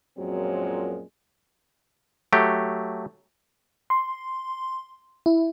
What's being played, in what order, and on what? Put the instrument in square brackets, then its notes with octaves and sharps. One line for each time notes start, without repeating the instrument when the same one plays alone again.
[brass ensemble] F#2 A#2 F3 F#3 G#3 C4
[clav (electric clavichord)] F#3 A3 G4
[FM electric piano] C6
E4